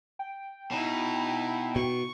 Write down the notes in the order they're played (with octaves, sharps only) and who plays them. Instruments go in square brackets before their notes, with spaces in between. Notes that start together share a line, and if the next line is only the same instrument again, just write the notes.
[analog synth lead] G5
[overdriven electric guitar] B2 [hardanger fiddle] D#4 E4
[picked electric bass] B2 [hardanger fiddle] C#6